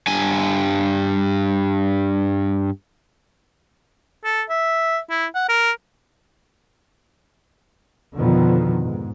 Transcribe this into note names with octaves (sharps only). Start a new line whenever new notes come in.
G2 G#5
A4
E5
E4
F#5
A#4
F2 B2 D3 D#3 F3 B3
G#2